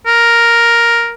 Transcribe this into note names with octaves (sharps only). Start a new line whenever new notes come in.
A#4